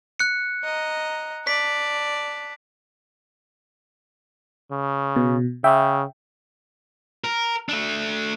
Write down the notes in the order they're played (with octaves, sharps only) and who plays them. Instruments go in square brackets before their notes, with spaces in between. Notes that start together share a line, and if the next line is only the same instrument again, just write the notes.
[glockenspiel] F#6 C#7
[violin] D#5 A#5
[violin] D5 A5 [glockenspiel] B6
[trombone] C#3
[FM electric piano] B2
[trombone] C#3 [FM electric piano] E5 G5
[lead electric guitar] A#4
A3 D4